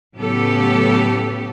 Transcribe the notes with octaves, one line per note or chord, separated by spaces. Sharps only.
A2 C#3 F#3 B3 G4 A4